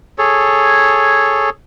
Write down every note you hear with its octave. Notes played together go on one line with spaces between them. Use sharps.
G#4 A4 C#5